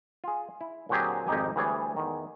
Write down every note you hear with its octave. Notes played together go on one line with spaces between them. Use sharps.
F4 G#4
E4
A#2 D3 F#3 C4 G4 G#4
G#1 F2 D#4 G4 G#5
D2 E3 G3 G#4 C#5 D5
E2 D#3